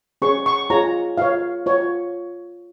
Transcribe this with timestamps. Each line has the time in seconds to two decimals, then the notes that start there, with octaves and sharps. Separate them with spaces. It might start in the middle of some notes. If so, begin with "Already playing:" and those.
0.22 C#4 G#4 C#5 C#6
0.46 C#6
0.70 F4 G#4 C#5 A#5
1.17 F4 C#5 F5
1.66 F4 C#5